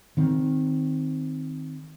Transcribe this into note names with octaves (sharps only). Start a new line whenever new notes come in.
D#3 C4